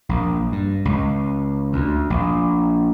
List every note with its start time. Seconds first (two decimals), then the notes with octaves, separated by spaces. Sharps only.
0.09 A#1
0.52 G2
0.85 C#2
1.73 D2
2.10 A#1